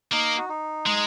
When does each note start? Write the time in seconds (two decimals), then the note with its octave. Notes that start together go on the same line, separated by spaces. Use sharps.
0.12 A#3 D#4
0.38 F#4
0.49 D#4
0.86 G#3